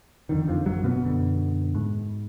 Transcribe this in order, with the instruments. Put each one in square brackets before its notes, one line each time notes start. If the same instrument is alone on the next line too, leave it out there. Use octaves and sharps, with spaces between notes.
[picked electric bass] F2 D3 D#3
F2 F3
F#2 F#3
B2 B3
F#2 D3
G#2